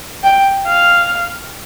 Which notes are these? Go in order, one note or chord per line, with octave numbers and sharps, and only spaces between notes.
G5
F5